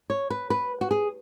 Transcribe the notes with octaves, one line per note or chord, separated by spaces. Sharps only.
C#5
B4
B4
F#4
G#4